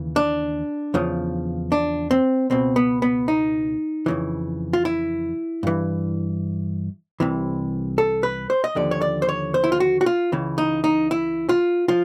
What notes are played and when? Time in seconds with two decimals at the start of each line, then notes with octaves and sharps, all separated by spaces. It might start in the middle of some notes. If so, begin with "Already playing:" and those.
Already playing: D#2 C#3 E3
0.16 D4
0.94 E2 C#3 F3
1.72 D4
2.11 C4
2.50 C#2 B2 C4
2.76 B3
3.02 B3
3.28 D#4
4.06 F2 C#3 E3
4.73 F4
4.85 E4
5.63 G2 E3
7.20 C2 C3 E3
7.98 A4
8.23 B4
8.50 C5
8.64 D#5
8.75 D#2 D3 F3 D5
8.91 C#5
9.02 D5
9.22 C5
9.29 C#5
9.54 C5
9.64 E4
9.72 F4
9.80 F#4
10.01 F#4
10.06 F4
10.32 C#2 C#3 E3
10.58 D#4
10.84 D#4
11.11 E4
11.49 F4
11.88 F3 F4